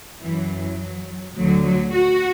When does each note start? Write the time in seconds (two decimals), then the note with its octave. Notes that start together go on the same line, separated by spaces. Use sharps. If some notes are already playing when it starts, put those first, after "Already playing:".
0.23 F#2 E3 F#3
1.37 D2 D3 F#3
1.66 F#3
1.95 F#4